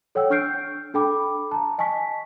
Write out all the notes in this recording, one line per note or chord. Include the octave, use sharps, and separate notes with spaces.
A4 C#5 F#5 G5 E6
D4 C#6 F6 G6 C7 D7
D4 A4 G5 B5 D6
A5 A#5
D#5 G#5 A5 C#6 B6